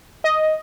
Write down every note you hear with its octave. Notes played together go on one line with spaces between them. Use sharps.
D#5